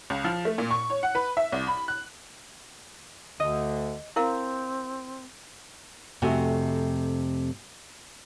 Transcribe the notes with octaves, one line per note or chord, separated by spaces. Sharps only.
C#2
F3
A3
A#2
C#6
C#5
F#5
B4
E5
C2
B5
F#6
D2 D3 D#5
C4 E4 A#4 F5
F2 C3 A3 F#4 G#5